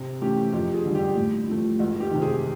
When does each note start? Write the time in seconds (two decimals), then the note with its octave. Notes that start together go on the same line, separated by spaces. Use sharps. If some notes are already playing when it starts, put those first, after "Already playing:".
Already playing: C3
0.21 E3 A3 C#4 G4
0.52 F2 G4
0.74 G#4
0.85 D3 G3
0.95 G4
1.16 A2
1.47 F3 A3
1.79 C#2 F#4
2.00 G4
2.11 C3 D#3
2.22 G#4